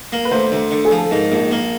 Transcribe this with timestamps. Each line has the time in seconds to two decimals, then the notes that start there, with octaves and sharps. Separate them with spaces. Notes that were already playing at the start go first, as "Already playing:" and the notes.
0.12 A#3
0.25 B4
0.32 D2 C5
0.52 D2
0.71 D3
0.85 G#4
0.91 F3
0.98 A4
1.11 G#2 A#4
1.32 A#1
1.51 A#3